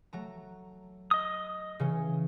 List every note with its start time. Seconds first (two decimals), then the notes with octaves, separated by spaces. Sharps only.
0.13 F#3 A3 A#5
1.11 D#5 D#6
1.79 C#3 E3 C#4